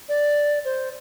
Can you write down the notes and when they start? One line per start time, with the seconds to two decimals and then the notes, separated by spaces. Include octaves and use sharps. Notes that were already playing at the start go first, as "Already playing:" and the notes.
0.09 D5
0.65 C5